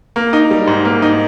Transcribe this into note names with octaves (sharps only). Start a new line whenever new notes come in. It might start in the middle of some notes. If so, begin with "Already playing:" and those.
A#3
D#4
G3
G#2
A#3
D#4